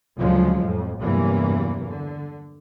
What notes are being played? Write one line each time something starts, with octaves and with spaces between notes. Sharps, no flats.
D2 C#3 F3 F#3 G#3
F2 A2
E2 G2 C3 E3 F#3 A#3
D3